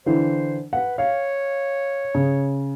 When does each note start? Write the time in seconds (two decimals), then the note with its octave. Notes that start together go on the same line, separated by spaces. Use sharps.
0.06 D3 E3 C5
0.73 B4 F#5
0.98 C#5 F5
2.15 C#3